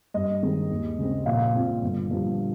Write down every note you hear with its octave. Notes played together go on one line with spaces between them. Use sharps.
G2 D#5
D#3 G#3 C4
D#2
C#3 G#3 C4
A#1 F5
A#2 F3 C4
G1
G2 F3